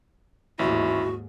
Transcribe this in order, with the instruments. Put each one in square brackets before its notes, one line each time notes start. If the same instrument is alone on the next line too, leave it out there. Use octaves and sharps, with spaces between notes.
[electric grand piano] A1 [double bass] D#2 G#2 [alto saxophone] E4 [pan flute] F#4